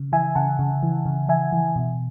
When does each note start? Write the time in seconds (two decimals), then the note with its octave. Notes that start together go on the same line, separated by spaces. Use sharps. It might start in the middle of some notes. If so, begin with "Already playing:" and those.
Already playing: C#3
0.12 E3 E5 G#5
0.35 C#3 F#5 A5
0.59 C#3
0.83 E3
1.06 C#3
1.28 E3 E5 G#5
1.52 E3
1.76 B2